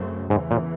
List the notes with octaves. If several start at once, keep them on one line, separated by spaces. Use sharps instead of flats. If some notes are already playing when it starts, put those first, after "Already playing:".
Already playing: F#2 C#3 F#3 A3 C4
E2 G#2 C#3 E3
A#2